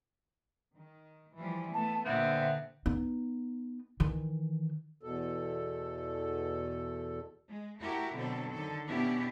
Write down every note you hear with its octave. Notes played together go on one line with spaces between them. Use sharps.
D#3
E3 F3 G3
A3 B3 A5
A#2 D3 B3 C4 E5
B3 D#4
D#3 E3
E2 B2 A4
G#3
A3 E4 F#4 G4 A#4
B2 D3 F#3 C4 A4
D3 D#3 A4
B2 B3 C#4 D4 E4 G4